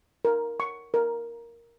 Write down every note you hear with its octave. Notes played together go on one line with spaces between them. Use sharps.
A#4
C#6
A#4